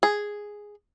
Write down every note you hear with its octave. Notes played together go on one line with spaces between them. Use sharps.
G#4